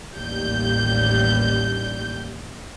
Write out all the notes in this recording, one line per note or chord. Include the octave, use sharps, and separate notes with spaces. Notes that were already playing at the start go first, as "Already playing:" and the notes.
A1 D#2 G3 G6